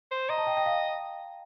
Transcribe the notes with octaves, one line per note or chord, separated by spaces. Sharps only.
C5
D#5 A#5
A5
G5
G5
F5